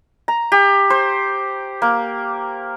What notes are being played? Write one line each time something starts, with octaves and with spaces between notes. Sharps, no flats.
A#5
G4
C5
A#3